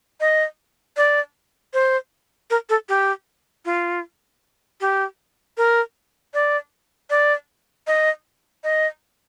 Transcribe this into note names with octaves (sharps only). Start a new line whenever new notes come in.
D#5
D5
C5
A#4
A4
G4
F4
G4
A#4
D5
D5
D#5
D#5